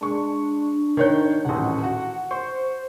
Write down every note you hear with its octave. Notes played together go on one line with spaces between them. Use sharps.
G#3 D4 C#6
D#3 C#5 G6
D#1 A1 F#5
F#4
C5 C#6